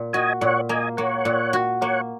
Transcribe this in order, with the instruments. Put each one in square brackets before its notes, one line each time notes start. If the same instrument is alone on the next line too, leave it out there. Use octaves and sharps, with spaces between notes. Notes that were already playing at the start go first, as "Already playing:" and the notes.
Already playing: [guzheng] A#2
[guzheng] F#4 [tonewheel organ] D#5 G#5
[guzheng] A#2 [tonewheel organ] C#5 F#5
[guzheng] A#3 [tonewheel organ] D#5 G#5
[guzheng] A#3 [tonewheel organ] C#5 F#5
[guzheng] A#2
F#4
[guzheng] A#3 [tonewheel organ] C#5 F#5